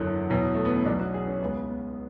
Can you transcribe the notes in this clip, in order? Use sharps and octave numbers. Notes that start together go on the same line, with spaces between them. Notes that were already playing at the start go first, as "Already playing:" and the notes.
Already playing: F#1 E2 D3 F#3
E2 B2 F#3
A3
B3
C#4
B1 B2 F#3 D4
F#4
G#4
C#4
C#2 C#3 G#3 B3
B3